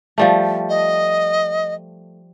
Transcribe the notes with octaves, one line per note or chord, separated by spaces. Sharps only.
F3 G3 A3
D#5